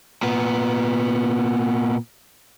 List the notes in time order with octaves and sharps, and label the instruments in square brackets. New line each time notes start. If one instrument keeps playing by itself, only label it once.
[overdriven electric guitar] A#2 B3